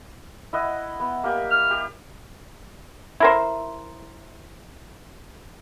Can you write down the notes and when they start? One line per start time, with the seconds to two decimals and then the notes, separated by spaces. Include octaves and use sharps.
0.53 E4 D#5 F#5
1.00 B3
1.24 A#3 G4 G#5
1.51 F6
1.71 G4
3.20 E4 A#4 C5